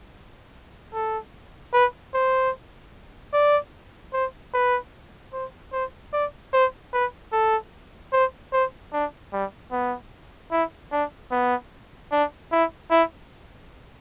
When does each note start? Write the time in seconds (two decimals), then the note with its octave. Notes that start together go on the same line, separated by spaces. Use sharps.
0.94 A4
1.73 B4
2.14 C5
3.33 D5
4.13 C5
4.53 B4
5.33 C5
5.72 C5
6.13 D5
6.53 C5
6.93 B4
7.32 A4
8.12 C5
8.52 C5
8.93 D4
9.33 G3
9.72 B3
10.51 E4
10.92 D4
11.31 B3
12.11 D4
12.52 E4
12.91 E4